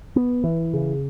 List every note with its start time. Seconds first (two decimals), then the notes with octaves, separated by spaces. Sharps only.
0.16 B3
0.44 E3
0.74 C#3